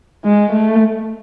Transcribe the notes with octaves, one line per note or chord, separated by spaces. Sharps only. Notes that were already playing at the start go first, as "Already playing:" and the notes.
G#3
A3